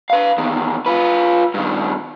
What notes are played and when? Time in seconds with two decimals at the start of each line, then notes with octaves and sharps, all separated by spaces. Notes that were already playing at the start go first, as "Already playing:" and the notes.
0.10 B4 F5
0.38 E2 D#3
0.86 F4 B4
1.54 G2 D#3